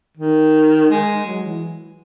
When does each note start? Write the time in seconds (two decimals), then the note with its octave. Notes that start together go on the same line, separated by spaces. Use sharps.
0.17 D#3
0.90 G#3
1.26 F#3
1.43 E3